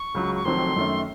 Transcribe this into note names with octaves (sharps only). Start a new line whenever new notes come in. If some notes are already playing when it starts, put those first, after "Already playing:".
Already playing: C#6
C#2 C#3 F#3
C#6
F1 F2 D#3 F#3 C4 C6
F#2 D#3 A3 C#4